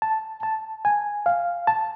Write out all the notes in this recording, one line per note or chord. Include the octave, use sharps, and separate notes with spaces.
A5
A5
G#5
F5
A5